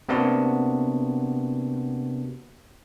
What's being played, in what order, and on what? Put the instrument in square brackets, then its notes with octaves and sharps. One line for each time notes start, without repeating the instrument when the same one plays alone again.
[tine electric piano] C3 A#3 B3 D4 F#4